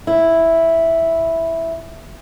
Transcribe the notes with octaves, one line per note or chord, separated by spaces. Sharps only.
E4